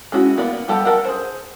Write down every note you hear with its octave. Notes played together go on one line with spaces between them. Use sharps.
G#3 C#4 E4 F#4
A#3 B3 D5
G3 G4 A4 F#5
A4 A#4 F#5
G#4 C5